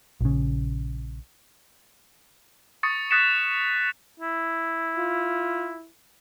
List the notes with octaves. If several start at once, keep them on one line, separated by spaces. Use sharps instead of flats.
A#1 C#3
C#6 D#6 A6 C#7
D#6 F#6 A6 B6 C#7 E7
E4
F4